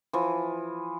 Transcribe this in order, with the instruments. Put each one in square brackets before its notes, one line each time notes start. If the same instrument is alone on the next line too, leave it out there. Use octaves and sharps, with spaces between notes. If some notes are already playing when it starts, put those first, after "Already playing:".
[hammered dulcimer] E3 F3